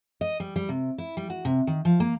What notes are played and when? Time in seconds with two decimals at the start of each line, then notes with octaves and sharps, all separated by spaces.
0.21 D#5
0.40 G3
0.56 G3
0.69 C3
0.98 E4
1.17 G3
1.30 F#4
1.45 C3
1.67 D#3
1.85 F3
2.00 A#3